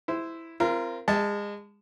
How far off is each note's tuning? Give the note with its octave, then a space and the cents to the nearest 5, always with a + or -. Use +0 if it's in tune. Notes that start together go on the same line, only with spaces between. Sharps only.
E4 +0 C5 -15
C4 +0 F4 -35 A#4 +0
G#3 -25 E5 -15 A5 +0